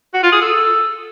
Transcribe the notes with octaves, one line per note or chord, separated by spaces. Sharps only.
F#4
F4
G#4
A4